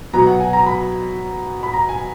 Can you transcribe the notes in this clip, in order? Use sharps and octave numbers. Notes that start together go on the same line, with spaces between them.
B2 F#3 B3 A#5
F#5
G#5
A#5
B5
B5
A#5
G#5